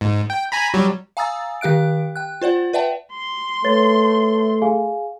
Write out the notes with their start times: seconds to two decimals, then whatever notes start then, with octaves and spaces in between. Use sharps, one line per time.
0.01 G#2
0.30 G5
0.52 G#5 A#5 B5
0.74 F#3 G3
1.17 F5 G#5 A#5 D#6 E6 A6
1.61 D#3 G4 F5 F#6 D7
2.16 G5 F#6
2.41 F4 C5 D5 F#5
2.73 B4 D5 E5 F#5 G5 A5
3.13 C6
3.64 A3 B4 C#5 A6
4.62 G#4 F5 G#5